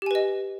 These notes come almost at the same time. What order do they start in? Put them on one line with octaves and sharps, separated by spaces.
G4 G#5 B4 D#5